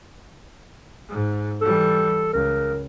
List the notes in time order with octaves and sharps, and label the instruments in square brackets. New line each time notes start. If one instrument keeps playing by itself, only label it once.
[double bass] G#2
[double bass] E3 G3 [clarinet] A4
[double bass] C#2 [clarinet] A#4